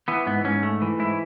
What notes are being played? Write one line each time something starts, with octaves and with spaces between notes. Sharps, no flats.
E3 B3
G#2 B3
G#2 C#4
A3
E3
G#2 E4